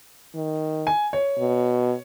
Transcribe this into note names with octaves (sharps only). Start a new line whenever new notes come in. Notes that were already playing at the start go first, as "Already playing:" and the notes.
D#3
G#5
C#5
B2